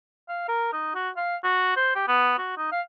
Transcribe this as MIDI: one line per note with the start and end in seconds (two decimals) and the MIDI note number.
0.29 0.44 77
0.48 0.69 70
0.73 0.92 63
0.95 1.10 66
1.17 1.36 77
1.44 1.76 66
1.76 1.91 72
1.95 2.07 67
2.08 2.37 59
2.39 2.52 66
2.57 2.70 63
2.72 2.81 77